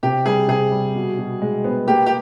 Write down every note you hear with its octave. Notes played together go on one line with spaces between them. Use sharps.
C3 G4
G3 G#4
C3 G#4
G3
B2
B2
G#3
B3
A#3 G4
G4